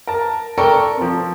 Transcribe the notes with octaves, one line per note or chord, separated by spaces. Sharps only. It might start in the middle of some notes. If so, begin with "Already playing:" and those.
A#4 A5
A4 A#4 D5 G5 C#6
F3 C4